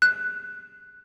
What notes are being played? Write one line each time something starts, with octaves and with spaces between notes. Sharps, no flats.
F#6